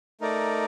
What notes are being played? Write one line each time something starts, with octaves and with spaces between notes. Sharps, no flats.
A3 D#4 A#4 D5